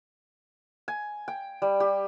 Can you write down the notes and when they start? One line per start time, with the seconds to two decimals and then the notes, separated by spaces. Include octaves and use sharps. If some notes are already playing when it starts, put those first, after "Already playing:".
0.88 G#5
1.28 G5
1.62 G3
1.80 G4